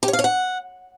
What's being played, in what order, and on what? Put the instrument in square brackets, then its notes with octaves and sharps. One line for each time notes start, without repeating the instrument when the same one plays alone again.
[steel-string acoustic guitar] G4
C#5
F5
C#5
F#5